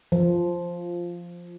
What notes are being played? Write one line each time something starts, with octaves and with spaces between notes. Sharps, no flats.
F3